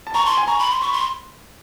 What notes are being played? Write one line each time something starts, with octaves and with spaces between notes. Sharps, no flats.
A5
A#5 C#6
A5 C6
G#5
A#5 C#6
B5
C6
B5 C#6
C6